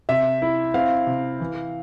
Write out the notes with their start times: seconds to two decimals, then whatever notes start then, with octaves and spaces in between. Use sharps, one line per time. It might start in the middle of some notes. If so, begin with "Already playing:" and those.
0.09 C3 E5
0.42 E4
0.74 C4 F5
1.07 C3
1.40 E3